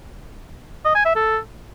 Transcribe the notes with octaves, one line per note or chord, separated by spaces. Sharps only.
D#5
G#5
E5
A4